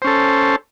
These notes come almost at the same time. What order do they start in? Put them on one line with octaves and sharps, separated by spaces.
C5 C#4 A4